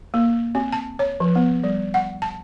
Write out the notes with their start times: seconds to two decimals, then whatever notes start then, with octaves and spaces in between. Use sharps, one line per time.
0.14 A#3
0.55 C4
0.72 A5
0.99 C#5
1.20 F3
1.36 B3
1.64 G3
1.94 F#5
2.22 A5